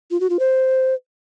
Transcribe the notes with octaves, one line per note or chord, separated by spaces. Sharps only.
F4
F#4
F4
C5